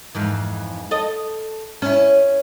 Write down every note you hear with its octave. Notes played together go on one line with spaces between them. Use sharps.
F2 G#2 E3
A4 D#5
C#4 E4